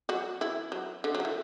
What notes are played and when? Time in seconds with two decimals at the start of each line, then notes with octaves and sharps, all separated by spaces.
0.09 F#3 F#4
0.41 E3 E4
0.72 F#3
1.04 D3
1.15 F#3
1.20 D3
1.25 E3